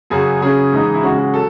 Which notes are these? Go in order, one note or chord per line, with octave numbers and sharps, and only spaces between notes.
F#2 C#3 F#3 G#4
C#3 F#3 C#4 G#4
G#2 E3 G#3 D#4
E4
C#3 G#3 C#4 F#4
F#4
F#3 A4